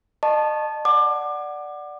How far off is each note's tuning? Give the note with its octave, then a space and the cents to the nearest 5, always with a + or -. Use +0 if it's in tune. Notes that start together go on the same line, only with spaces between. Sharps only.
D#5 -35 A5 +0 C#6 -25
D5 +0 F#5 +5 D6 +25